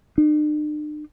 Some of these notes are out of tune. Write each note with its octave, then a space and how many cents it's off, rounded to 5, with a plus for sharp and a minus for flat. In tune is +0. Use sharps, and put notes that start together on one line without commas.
D4 +45